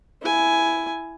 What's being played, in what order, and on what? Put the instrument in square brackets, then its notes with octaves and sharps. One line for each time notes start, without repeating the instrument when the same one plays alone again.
[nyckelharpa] E4 G#5